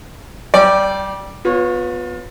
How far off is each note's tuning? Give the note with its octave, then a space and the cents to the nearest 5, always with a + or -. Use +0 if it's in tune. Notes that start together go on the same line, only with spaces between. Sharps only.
G3 -25 D5 +0 G5 +0
B3 +0 F4 +35 C#5 -20